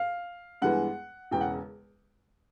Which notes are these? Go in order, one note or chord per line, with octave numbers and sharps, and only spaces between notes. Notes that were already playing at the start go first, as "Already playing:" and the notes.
Already playing: F5
G2 E3 G#3 B3 F#5
E1 E2 C#3 G5
F#5